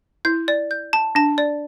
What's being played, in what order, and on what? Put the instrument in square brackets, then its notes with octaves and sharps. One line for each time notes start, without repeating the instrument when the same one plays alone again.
[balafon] E4 [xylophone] G6
[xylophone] D5
G6
A5
[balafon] D4 [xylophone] A5
[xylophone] D5